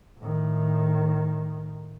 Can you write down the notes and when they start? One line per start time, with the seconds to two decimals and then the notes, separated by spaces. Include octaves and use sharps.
0.19 A2 D#3